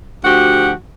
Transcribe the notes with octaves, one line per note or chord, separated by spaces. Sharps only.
D2 F3 F#4 G4 F#5